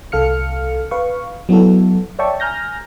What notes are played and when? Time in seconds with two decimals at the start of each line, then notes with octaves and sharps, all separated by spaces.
0.12 C2 A4 F5 F6 C#7
0.91 B4 F5 C#6
1.49 F#3 B3 E4 F#4 A4
2.19 C#5 D5 E5 G5 A5 C#6
2.40 G#5 A#5 F6 G6 A#6